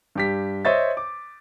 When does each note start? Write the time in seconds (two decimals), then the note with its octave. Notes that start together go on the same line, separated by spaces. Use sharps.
0.15 G2 G4 B6
0.65 C5 C#5 D#5 E5 A6
0.97 D6